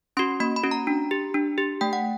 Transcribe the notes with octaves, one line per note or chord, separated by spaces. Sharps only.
C#4 F#4 C6
A#3 B5
B5
C#4 F#4
A#5
D4
G4
D4
G4
A3 G5
F#5